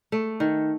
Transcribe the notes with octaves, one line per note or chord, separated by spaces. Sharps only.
A3
D#3